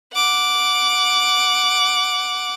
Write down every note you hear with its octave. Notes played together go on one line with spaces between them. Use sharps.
F#5 D6